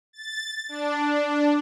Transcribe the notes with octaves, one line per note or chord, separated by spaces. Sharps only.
A6
D4